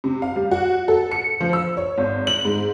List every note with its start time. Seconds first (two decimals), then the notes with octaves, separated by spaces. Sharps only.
0.04 C3
0.22 F5
0.36 G3
0.51 F#4
0.88 A4
1.11 C#7
1.40 F3
1.53 E6
1.77 C#5
1.98 G#1
2.27 F#7
2.45 G#2